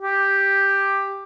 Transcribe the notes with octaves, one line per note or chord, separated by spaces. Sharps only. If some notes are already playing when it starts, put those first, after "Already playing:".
G4